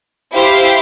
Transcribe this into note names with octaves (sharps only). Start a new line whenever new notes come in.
E4 G4 C5 F5